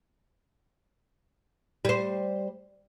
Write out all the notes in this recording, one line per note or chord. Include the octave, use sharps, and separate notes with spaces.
G3 C5